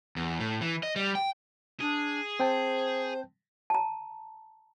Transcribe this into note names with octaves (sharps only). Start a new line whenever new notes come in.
E2
A2
E3
D#5
G3
G5
D4 G#4
C4 C5 G5 A5
A5 A#5